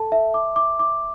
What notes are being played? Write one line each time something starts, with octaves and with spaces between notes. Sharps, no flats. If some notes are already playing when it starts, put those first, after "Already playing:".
Already playing: A4 A5
E5
D6
D6
D6